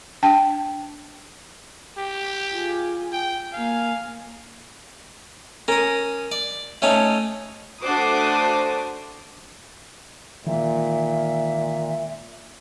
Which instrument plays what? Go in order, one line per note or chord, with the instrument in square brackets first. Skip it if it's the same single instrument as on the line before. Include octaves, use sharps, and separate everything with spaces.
[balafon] D4 G5 A5
[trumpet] G4
[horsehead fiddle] F4 G#4
[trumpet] G5
[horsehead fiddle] A#3 G#5 [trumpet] F5
[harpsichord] C#4 D#6 [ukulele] A#4
[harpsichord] D5
[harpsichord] A3 C#4 D#4 [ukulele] C#5 A5
[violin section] A3 D4 F#4 C5 D6 D#6
[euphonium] A#2 [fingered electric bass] D#3 E3 G#3 [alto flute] E5